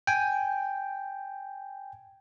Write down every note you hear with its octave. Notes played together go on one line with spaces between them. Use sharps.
G5 G#5